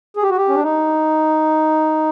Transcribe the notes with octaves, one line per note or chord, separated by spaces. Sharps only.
G#4
G4
F#4
G4
C#4
D4
D#4